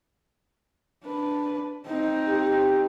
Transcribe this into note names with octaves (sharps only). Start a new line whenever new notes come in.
D4 B4
C4 D#4
G4